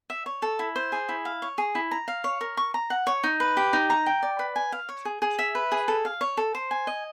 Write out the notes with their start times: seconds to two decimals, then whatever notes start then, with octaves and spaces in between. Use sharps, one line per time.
0.10 E5
0.26 C#5
0.42 A4
0.59 E4
0.76 C5
0.92 G#4
1.09 E4
1.25 F5
1.42 C#5
1.58 G#4
1.75 E4
1.91 A#5
2.08 F5
2.24 C#5
2.41 A#4
2.57 C#6
2.74 A#5
2.90 F#5
3.07 C#5
3.24 D#4
3.40 B4
3.57 G4
3.73 D#4
3.90 A#5
4.06 G5
4.23 D5
4.39 B4
4.56 G#5
4.72 F5
4.89 C#5
5.05 G#4
5.22 G#4
5.39 E5
5.55 B4
5.72 G#4
5.88 A4
6.05 F5
6.21 C#5
6.37 A4
6.55 C5
6.71 G#5
6.87 D#5